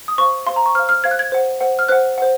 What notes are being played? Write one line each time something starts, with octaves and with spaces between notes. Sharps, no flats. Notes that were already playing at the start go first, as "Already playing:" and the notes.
D#6
C5 F5 C#6
C5 F5 C6
A#5
C#6
C5 F5 F6
F6
C5 F5 G#6
F#6
G#6
C5 F#5
C5 F#5
F6
C5 F#5 F#6
C5 F#5